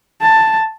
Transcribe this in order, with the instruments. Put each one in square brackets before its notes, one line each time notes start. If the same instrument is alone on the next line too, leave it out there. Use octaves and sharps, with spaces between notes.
[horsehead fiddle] A5